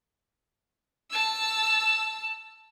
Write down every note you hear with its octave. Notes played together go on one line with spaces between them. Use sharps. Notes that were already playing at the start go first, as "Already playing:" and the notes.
A5 E6